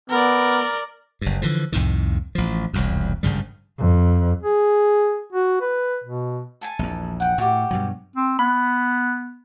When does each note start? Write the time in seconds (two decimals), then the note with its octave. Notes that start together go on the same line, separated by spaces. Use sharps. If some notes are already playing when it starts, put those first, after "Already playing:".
0.10 B3 A#4 D5
1.21 F#1 G2
1.42 D3 E3 F3
1.72 C2 F2 A2 D#3
2.35 A1 F3
2.74 E1 C2 F2
3.23 G#1 G2 C#3 G3
3.79 F2
4.43 G#4
5.33 F#4
5.61 B4
6.04 B2
6.61 A4 G#5 A5
6.79 A#1 E2
7.20 F#5 G5
7.38 A2 F#4 G4
7.71 G2 B2 F#3
8.16 C4
8.39 B3 B5